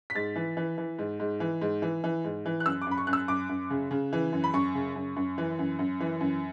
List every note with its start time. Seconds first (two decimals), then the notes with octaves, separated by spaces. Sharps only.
0.10 B6
0.15 G#2 A6
0.36 E3
0.57 E3
0.78 E3
0.99 G#2
1.20 G#2
1.40 E3
1.61 G#2
1.82 E3
2.04 E3
2.24 G#2
2.46 E3
2.60 F#6
2.66 F#2 E6
2.82 D6
2.87 F#2 B5
2.98 C#6
3.07 F#2 F#6
3.13 E6
3.28 F#2 D6
3.49 F#2
3.70 C#3
3.91 C#3
4.13 E3
4.33 F#2
4.44 B5
4.54 F#2 C#6
4.75 C#3
4.96 F#2
5.16 F#2
5.38 E3
5.59 F#2
5.79 F#2
6.00 E3
6.21 F#2